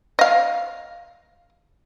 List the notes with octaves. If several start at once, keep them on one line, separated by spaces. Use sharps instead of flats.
D#5 F5